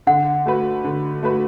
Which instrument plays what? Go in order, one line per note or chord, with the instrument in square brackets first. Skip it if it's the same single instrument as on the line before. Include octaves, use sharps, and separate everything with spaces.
[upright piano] D3 [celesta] F#5
[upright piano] A3 F#4 B4
D3
A3 F#4 B4